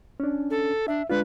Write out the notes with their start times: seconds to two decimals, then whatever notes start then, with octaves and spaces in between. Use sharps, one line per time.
0.20 C#4 D4
0.51 A4
0.88 D4 E5
1.10 G#3 D4 F4 B4